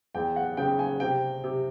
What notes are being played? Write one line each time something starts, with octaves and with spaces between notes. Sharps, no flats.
E2 G5
F#5
C#3 G5
G#5
C3 G5
C3